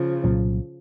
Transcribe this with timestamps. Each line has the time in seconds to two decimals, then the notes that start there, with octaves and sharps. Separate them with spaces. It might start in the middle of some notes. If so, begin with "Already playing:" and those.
Already playing: C#3 F3
0.24 C2 A#2 F#3 C#4